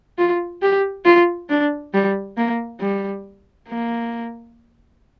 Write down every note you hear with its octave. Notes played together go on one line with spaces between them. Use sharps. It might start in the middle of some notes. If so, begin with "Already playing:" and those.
F4
G4
F4
D4
G3
A#3
G3
A#3